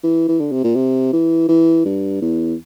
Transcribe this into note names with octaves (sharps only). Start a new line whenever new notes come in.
E3
E3
D3
C3
A#2
C3
E3
E3
G2
E2